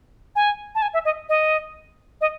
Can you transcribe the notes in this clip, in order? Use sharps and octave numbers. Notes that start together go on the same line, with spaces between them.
G#5
A5
G#5
E5
D#5
D#5
D#5